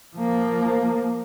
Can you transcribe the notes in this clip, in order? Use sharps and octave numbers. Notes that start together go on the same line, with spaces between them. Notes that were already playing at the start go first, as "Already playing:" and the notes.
F3 A#3